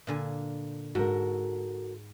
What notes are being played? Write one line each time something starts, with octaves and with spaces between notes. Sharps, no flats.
A#2 D3 G#5
G#2 F#4 A4 A#4